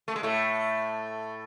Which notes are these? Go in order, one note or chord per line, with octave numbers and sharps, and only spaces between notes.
A3
G#3
A2 A3